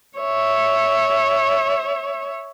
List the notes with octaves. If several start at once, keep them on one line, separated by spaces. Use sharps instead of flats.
C#5 E5